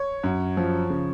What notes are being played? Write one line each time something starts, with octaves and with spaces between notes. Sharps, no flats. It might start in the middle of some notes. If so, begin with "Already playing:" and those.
Already playing: C#5
F#2
F3
C#3